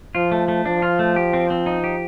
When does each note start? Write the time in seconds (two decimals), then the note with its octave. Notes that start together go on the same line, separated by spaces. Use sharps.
0.15 F3 F4
0.32 A3
0.48 A3
0.65 F3 D4
0.82 F4
0.99 A3
1.16 G4
1.33 C4
1.50 C4
1.66 D#4
1.84 G4